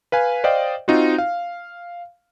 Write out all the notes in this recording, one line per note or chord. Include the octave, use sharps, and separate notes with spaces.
B4 F5 G#5
C5 D5 D#5 F5 G5
C4 D#4 F4 F#4
F5